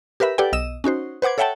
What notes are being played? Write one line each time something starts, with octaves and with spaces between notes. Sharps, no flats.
G4 A#4 B4 E5 B5
G4 A4 B4 D5 F#5 G5
B1 D#5 E6 E7
C#4 D#4 F#4 C5
B4 C5 F#5 D6 G#6
A4 C#5 E5 F#5 G5 A5